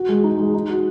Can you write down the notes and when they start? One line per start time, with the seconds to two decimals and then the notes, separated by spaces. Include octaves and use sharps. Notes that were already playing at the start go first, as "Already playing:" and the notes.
Already playing: F#4
0.09 G#3
0.24 D#4
0.39 G#3
0.54 D#4
0.69 F#4